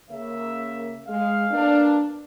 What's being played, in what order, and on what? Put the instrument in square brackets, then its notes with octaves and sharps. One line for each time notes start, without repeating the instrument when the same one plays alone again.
[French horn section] C#3 A#3 [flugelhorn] E5
[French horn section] G#3 [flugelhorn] F5
[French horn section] A#3 B3 D4